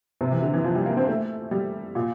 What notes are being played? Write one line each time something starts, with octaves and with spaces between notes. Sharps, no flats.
C3
E3
D3
E3
F3
G3
A#3
C4
A3
G3
A#2